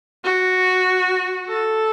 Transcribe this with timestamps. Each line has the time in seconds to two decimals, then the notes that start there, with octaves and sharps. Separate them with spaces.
0.24 F#4
1.49 A4